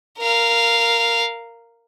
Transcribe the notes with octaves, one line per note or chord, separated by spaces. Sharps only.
A#4 F5